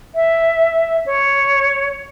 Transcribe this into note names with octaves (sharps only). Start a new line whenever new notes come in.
E5
C#5